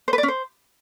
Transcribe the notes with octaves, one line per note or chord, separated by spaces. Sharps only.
C5
B4
D5
C#4
C5